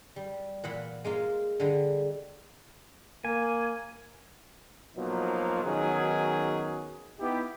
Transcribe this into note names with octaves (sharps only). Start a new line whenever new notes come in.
G3
A#2 E3 F#5 B5
G#3 A#3 F4
D3 G3 G#3
A#3 G#5
B2 F3 F#3 A#3 D#4 F4
B2 D#3 F#3 C#4 D#4 G#4
B3 D#4 E4 G4